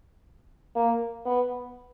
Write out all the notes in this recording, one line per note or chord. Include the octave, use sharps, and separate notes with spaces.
A#3
B3